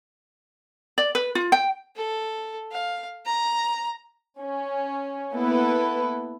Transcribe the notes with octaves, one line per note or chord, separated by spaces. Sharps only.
D5
B4
F4
G5
A4
F5
A#5
C#4
A#3 B3 E4 A4 B4